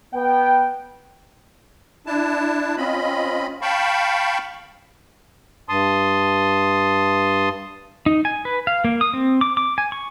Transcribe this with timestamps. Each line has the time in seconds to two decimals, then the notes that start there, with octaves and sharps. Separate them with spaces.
0.14 B3 G5
2.06 D4 E4 A5
2.77 C4 C#4 F4 D#5 B5
3.62 F5 G5 A5 B5 C#6
5.69 G2 A5 C6 D#6
8.06 D#4
8.25 G#5
8.45 B4
8.67 F5
8.84 A#3
9.01 D#6
9.14 C4
9.41 D6
9.57 D6
9.78 G#5
9.92 C#6